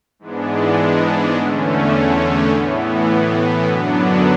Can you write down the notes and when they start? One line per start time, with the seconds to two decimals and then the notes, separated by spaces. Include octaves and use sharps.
0.19 G#2 E3 G#3 B3 D4
1.35 E2 D3 A3 C#4
2.50 A2 E3 B3
3.66 F#2 D3 F#3 B3 D4